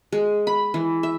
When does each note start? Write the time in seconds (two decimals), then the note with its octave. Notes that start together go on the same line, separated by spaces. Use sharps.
0.12 G#3
0.47 B5
0.74 E3
1.03 E5